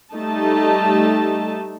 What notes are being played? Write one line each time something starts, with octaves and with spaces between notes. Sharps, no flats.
G3 A3 D#4 A5